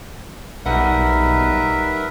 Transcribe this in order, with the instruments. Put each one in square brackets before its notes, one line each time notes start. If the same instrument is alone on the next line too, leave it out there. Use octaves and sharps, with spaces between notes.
[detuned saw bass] B1 [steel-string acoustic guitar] G3 D#4 F#5 [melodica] A#4 B4 E5